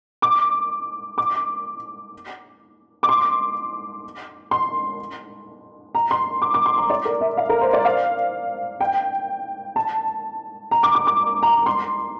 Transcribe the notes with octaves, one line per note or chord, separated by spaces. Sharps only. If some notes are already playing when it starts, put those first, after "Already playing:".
D6
D6
D6
C6
C6
A#5
C6
D6
D6
C6
A#5
D5
A#4
E5
F5
A#4
C5
D5
F5
G5
A5
A#5
D6
D6
D6
A#5
C6